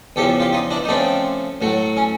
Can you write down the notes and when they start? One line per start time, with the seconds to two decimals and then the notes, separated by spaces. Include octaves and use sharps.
0.16 E2 C#3 F3 G4 A4
0.40 F4 G4
0.53 D#4 F4
0.70 D4 E4
0.84 D#4
0.88 C#3 F3 A3 C4 D4
1.61 A2 F#3 A3
1.97 C#4